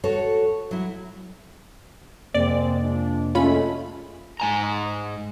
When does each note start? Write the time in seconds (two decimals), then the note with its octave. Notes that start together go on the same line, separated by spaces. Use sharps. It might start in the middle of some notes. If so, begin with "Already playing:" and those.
0.04 F#4 A4 C#5
0.71 F#3 E4
2.34 F2 C3 G#3 A#3 C4 D5
2.82 F3 G#3 D4
3.35 G#3 A3 C#4 F4 B5
4.40 G#2 G#5 A#5